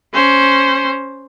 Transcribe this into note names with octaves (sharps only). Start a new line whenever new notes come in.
C#4 C5